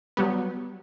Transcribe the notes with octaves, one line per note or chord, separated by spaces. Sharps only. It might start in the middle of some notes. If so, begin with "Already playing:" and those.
F#3 G3 B3